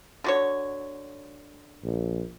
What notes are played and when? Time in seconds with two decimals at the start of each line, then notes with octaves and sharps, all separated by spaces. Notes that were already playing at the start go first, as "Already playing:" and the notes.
0.24 D3 F#4 C#5
1.84 A#1